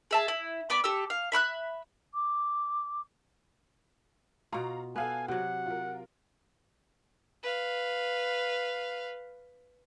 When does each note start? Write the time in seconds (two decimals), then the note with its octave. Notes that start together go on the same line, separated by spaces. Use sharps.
0.11 G#4 E5 A5
0.28 E4
0.70 B3 D5 B5 D6
0.84 G4 A4 E6
1.10 F5
1.32 E5 B5 F6 F#6
2.14 D6
4.52 B2 F4 F5 A#5 C#6
4.96 B3 A4 F5 G#5 F#6
5.28 C3 F#3 F#4 F#5
5.66 F4 A#4
7.43 B4 F5